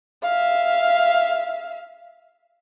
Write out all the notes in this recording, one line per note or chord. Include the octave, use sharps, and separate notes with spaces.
E5 F5